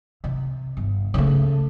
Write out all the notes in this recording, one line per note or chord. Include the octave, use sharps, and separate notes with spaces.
C3
G1
C#3 A3